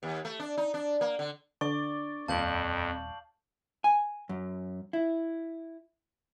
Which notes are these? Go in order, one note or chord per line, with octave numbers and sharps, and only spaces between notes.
D#2
A3
D4
D#4
D4
A#3
D3
D3 D5 C#6
D#1 F2 F5 A5 G6 F#7
G#5
F#2
E4